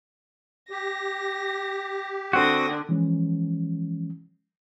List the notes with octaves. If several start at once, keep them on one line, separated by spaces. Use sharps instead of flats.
G4 A#6
D3 C4 F#4 D#6 A#6
E3 F3 G#3 C#4